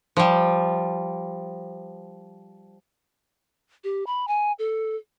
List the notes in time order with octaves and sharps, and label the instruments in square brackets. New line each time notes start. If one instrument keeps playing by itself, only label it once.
[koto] F3 G3
[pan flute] G4
B5
G#5
A4